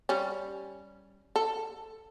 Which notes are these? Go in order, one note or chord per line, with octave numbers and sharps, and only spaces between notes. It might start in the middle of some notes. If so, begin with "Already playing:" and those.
G3 C#4
A4